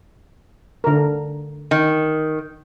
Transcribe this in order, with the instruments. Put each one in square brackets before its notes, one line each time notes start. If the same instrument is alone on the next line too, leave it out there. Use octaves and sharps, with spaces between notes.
[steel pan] D3 A#4
[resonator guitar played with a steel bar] D#3